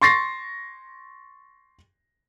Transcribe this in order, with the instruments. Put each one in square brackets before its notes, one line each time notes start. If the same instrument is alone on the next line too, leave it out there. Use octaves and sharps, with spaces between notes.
[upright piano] C6 C#6 A6 A#6 C7